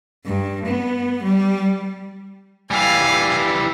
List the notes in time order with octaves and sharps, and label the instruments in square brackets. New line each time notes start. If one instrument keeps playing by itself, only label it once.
[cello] G2
B3
G3
[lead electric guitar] E3 G3 [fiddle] F5 G#5